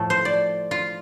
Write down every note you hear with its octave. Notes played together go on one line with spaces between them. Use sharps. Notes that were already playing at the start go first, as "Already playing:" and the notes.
Already playing: A2 F3 A3 A4
C5
D5
F4